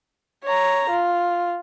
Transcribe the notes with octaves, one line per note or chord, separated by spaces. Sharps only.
C#5 A#5
F4